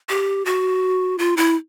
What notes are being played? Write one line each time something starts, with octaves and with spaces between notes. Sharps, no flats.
G4
F#4
F4
E4